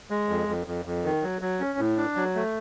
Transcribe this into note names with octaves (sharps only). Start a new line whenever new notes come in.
G#3
F2
F2
F2
F2
D#3
F#3
F#3
C#4
A2
D4
F#3
A3